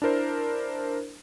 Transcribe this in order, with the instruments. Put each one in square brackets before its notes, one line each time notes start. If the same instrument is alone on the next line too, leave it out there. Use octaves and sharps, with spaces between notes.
[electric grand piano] D4 E4 A#4 C5